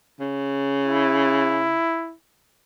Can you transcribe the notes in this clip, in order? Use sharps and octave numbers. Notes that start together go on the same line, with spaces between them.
C#3
E4